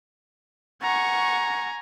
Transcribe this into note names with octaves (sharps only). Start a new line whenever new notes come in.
F#5 G#5 A#5 C#6